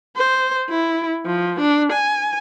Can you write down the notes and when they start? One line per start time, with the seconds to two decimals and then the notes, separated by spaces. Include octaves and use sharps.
0.17 C5
0.70 E4
1.26 F3
1.60 D4
1.92 G#5